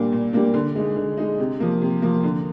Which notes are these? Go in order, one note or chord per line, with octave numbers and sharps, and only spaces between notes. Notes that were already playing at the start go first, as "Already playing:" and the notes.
Already playing: A#2 G3 A#3 D4
A#2
G3 A#3 D4
D3
G#3 D#4
D3
G#3 D#4
C3
F3 A#3
C3
F3 A#3
D3